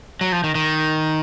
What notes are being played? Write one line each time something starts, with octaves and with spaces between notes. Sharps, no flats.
F#3
F3
D#3
D#3